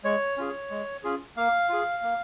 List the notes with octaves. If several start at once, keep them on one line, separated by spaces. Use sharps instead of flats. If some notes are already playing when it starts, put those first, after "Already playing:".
G#3 C#5
C#4 F4 G#4
G#3
C#4 F4 G#4
A#3 F5
F4 G#4
A#3